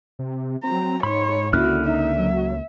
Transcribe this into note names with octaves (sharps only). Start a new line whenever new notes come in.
C3
F#3 C4 A#5
G#2 D#4 C#5 B5 C6
C#2 D3 A#3 C#4 E4 F#4 F6 F#6
D#4 E5
F#3